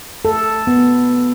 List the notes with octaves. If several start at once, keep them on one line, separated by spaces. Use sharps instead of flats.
A4
B3